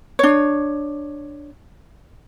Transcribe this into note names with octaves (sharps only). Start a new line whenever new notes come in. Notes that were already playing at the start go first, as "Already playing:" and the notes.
D4 C#5